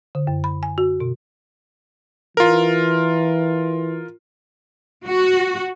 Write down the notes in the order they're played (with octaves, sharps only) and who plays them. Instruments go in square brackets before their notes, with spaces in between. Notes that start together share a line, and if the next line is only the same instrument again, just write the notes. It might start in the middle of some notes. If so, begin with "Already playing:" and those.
[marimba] D3
F#2
B5
G#5
F#4
B2
[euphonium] E3 [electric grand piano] F4 A#4
[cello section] F#4